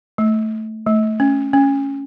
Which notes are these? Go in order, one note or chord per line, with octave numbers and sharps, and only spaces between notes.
A3
A3
C#4
C#4